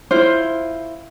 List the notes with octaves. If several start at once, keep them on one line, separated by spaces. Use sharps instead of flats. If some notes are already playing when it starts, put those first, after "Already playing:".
E4 F4 C5